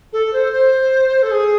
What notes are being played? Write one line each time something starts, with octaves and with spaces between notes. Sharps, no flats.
A4
C5
C5
A4
G#4